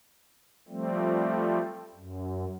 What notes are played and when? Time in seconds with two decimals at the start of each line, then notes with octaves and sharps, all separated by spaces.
0.68 F3 G3 A3 C4
1.95 F#2